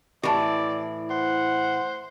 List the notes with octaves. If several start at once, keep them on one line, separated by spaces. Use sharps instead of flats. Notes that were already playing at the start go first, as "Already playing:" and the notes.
A2 E3 G4 D5 A5
C5 F#5